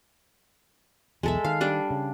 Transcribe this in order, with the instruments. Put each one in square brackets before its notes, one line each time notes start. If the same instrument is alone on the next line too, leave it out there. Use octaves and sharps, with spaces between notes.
[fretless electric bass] B1 E2 [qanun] G#3 A4 E5
[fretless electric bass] D#3 [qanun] F5
[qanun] G3 D4
[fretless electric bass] C#3